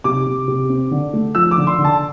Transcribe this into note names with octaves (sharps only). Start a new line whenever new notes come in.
C3 D6
C3
C3
C4
D3
A3
F3 E6
D6
D3
C6
D3
A5